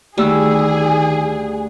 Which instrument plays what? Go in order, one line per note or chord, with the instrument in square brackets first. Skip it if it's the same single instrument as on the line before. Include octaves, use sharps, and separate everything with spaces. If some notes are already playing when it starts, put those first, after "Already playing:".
[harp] D2 A3 E6 [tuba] D#3 [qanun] G3 [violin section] G#4